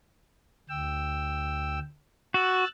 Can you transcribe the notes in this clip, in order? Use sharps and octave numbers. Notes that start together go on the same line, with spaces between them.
D2 G5 E6
F#4 E6 F#6 A6